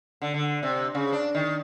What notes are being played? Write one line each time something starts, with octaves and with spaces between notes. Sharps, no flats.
D3
D3
C3
C#3
D4
D#3